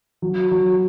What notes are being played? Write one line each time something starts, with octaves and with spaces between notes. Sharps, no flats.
F#3
F#3